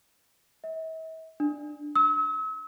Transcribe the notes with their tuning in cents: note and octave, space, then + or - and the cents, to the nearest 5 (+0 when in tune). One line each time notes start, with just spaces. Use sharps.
E5 -45
D4 +10
E6 -40